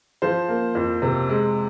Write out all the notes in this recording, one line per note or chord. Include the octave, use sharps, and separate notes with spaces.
F3 C5
A#3
F2
C3
G#3